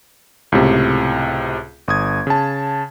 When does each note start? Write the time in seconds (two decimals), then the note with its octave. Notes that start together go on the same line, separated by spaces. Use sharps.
0.52 C#2 A2 C3
1.88 G1 D#6 G#6
2.27 C#3 A5